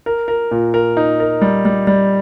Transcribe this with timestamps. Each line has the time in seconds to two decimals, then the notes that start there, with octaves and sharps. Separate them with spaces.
0.06 A#4
0.28 A#4
0.51 A#2
0.74 A#4
0.97 D#4
1.20 A#4
1.42 G3
1.65 G3
1.87 G3